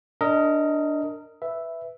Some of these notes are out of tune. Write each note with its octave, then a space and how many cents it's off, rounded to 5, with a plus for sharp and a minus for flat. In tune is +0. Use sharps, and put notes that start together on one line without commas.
D4 +0 A#4 -25 D#5 +15
B4 +5 E5 +0